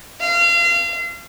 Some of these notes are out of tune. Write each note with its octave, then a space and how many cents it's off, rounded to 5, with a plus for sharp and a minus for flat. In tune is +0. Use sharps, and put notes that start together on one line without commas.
F5 -30